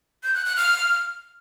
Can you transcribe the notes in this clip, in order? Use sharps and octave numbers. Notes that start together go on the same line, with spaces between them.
G6
F#6
F#6
F6